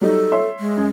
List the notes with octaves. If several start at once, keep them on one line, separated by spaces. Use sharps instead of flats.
F#3 G3 D#4 A4
C#5 E5 C6
G#3
F#2